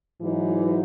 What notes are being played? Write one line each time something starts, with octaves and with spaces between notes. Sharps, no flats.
G#2 E3 F#3 D#4